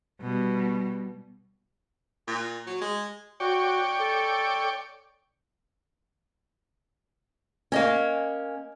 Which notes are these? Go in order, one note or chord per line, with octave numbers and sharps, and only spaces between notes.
B2 G3
A#2
F#3
G#3
F#4 C#5 D5 G5
A4
A#3 C#4 D#5 G#5